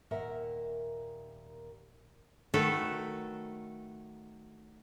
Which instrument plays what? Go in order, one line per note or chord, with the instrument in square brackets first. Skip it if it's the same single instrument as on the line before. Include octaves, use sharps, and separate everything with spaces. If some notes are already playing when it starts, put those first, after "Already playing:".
[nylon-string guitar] D#2 A#2 A#4 E5 F#5
[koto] D#3 F#3 A3 F#4 A4 B4